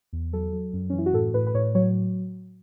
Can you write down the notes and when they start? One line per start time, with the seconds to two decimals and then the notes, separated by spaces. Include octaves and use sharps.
0.13 E2
0.33 F#3 A4
0.53 F#3
0.73 F#2
0.90 C#4
0.93 E3
0.98 E4
1.06 F#4
1.13 A2 A4
1.34 A2 B4
1.47 B4
1.54 A2 C#5
1.75 F#3 C#5